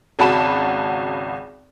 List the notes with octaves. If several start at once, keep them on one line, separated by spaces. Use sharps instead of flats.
G#1 C#2 F#4 A5 B5 E7